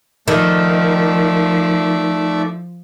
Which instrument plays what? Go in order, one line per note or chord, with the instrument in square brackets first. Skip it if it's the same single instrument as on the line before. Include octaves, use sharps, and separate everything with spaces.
[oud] D#3 [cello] F3 [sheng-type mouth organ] A3 D5 E5